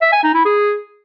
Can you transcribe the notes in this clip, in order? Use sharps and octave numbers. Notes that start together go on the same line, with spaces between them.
E5
G#5
D#4
E4
G#4